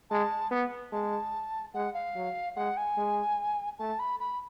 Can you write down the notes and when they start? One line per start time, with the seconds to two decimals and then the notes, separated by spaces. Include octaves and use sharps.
0.10 G#3 A5
0.51 B3
0.92 G#3 A5
1.74 G#3 F#5
1.94 F5
2.15 F#3
2.56 G#3 F#5
2.77 G#5
2.97 G#3
3.79 A3 A5
3.99 B5
4.20 B5